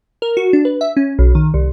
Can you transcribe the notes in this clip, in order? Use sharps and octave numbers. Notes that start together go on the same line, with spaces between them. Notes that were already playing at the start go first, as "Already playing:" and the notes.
A#4
F#4
D4
B4
E5
C#4
B1
D#3
C2